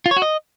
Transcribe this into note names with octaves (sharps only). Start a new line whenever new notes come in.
F4
C#5
F#4
D#5